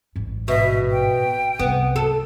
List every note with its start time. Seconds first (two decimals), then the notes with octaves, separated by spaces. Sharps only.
0.16 A1 G#2
0.48 B2 E5
0.91 G5
1.59 C2 B3
1.96 A4